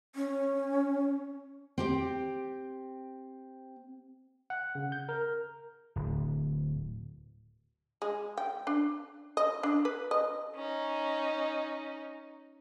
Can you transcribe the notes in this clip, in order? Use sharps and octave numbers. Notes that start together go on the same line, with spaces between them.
C#4
C4 G4 G5
F#5
C#3
G6
A#4
D1
G#3
G5
D4
D#5
D4
B4
D#5
C#4 D#4